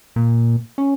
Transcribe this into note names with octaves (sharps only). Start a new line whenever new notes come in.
A#2
C#4